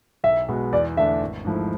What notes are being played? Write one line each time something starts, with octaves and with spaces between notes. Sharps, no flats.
B1 E5
B2 G#3 B3
E2 D5
D3 A3 D4 E5
G#1
G#2 F3 A3 E4